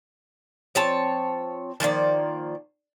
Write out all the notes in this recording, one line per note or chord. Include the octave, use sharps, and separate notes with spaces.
F3 C4 C#5 A5
D#3 F3 A#3 D5